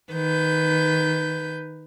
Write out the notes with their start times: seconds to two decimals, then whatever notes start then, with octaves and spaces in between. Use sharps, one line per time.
0.12 D#3 B4 G6